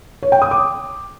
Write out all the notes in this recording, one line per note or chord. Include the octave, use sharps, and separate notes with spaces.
C#5
G5
D#6
D6